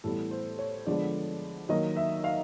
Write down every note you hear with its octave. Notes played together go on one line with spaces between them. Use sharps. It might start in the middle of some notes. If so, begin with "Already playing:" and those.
A2 E3 G3 B3 A4
C5
C#5
D3 F3 G#3 B3 D5
D#3 F#3 A#3 D#5
E5
F5